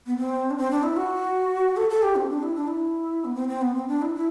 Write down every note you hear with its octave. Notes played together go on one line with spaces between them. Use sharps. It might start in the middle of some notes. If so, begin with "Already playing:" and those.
B3
C4
D4
C4
D4
E4
F#4
A4
A4
G4
C4
D4
E4
D4
E4
B3
C4
C4
B3
C4
D4
E4
E4